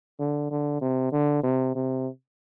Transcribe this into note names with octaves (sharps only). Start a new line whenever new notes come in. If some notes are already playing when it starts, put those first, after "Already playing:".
D3
D3
C3
D3
C3
C3